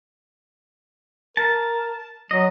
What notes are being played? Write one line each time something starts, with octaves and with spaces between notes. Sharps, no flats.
A#4 A5
F#3 D#5